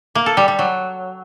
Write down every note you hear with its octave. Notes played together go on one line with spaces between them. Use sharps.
A#3
A4
G3
G3
F#3